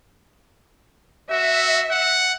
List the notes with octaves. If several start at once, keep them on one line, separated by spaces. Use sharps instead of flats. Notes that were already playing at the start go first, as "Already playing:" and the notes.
F#4 E5
F#5